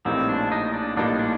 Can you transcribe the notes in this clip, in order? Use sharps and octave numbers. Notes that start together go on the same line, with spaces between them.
A#1 A2 G3 A#3 C4 D#4
D4
D#4
D4
A#1 A2 G3 A#3 D4 D#4
D4